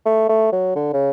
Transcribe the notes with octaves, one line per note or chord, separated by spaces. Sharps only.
A3
A3
F#3
D3
C#3